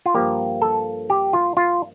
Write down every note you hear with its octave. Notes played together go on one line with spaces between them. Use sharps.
F4
G2 F3 A#3 G4
A4
G4
F4
F4